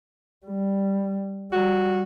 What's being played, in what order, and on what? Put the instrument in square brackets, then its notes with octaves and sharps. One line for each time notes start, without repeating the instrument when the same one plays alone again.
[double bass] G3
[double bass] G3 [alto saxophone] F#4